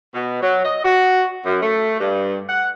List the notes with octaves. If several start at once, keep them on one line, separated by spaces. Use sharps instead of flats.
B2
F#3
D#5
F#4
F#2
A3
G2
F#5